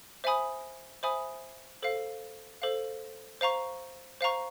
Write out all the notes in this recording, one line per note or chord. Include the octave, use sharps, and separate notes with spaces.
C5 E5 G#5 B5 D#6
C5 E5 G#5 B5 D#6
A4 C5 F5
A4 C5 F5
C5 F5 A#5 C#6
C5 F5 A#5 C#6